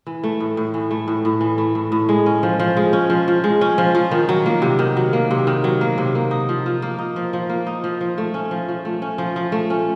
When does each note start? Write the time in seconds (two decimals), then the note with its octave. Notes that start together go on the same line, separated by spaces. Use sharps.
0.07 E3
0.23 A3
0.40 A2
0.57 A2
0.74 E3
0.91 A3
1.08 A2
1.25 A2
1.41 E3
1.58 A3
1.75 A2
1.92 A2
2.09 G#3
2.26 C#4
2.43 F3
2.60 F3
2.77 G#3
2.93 C#4
3.10 F3
3.28 F3
3.44 G#3
3.61 C#4
3.78 F3
3.95 F3
4.11 D#3
4.29 F#3
4.46 A#3
4.62 C3
4.79 D#3
4.97 F#3
5.13 A#3
5.31 C3
5.47 D#3
5.64 F#3
5.81 A#3
5.98 C3
6.15 A#3
6.31 D#4
6.49 F3
6.66 F3
6.82 A#3
6.99 D#4
7.16 F3
7.33 F3
7.49 A#3
7.67 D#4
7.84 F3
8.01 F3
8.18 A3
8.34 C#4
8.51 F3
8.69 F3
8.85 A3
9.02 C#4
9.18 F3
9.36 F3
9.52 A3
9.70 C#4